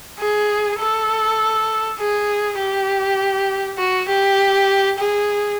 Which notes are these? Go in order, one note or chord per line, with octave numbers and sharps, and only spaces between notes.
G#4
A4
G#4
G4
F#4
G4
G#4